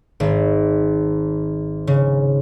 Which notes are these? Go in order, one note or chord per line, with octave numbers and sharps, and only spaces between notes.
G#1
C#3